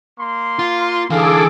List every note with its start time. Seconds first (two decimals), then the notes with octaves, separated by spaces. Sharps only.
0.19 A#3 C6
0.59 F4
1.10 D3 E3 G#4 A4 F5 D6